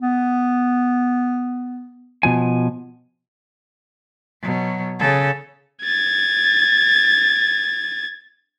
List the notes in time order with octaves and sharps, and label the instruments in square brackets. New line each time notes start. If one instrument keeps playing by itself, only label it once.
[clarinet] B3
[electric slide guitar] B2 F3 G#5
[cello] B2 F#3
C#3 A4
[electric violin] G#6 A6